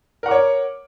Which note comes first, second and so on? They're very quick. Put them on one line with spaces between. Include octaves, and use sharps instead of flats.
A#4 F#5 D6 C#5